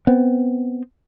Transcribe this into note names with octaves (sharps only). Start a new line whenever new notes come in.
B3 C4